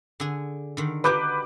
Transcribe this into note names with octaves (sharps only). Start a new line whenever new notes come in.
D3 G#4
D3 D#3
D#4 F#4 G4 B4 D6 G6